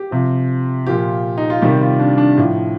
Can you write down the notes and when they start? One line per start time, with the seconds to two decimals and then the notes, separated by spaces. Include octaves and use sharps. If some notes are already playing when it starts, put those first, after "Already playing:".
Already playing: G4
0.11 C3 F3
0.86 A#2 F3 G4
1.38 D#4
1.50 F4
1.62 C3 D#3 G3 G4
1.81 F4
2.00 D4
2.18 D4
2.38 A2 F3